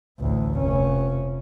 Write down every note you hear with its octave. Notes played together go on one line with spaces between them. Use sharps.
A1 D2
F1 C#4